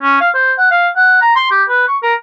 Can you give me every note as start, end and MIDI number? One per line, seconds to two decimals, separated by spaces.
0.02 0.20 61
0.21 0.29 77
0.35 0.53 72
0.58 0.68 78
0.71 0.88 77
0.96 1.20 78
1.21 1.35 82
1.36 1.49 84
1.51 1.63 67
1.69 1.85 71
1.88 1.97 85
2.03 2.14 70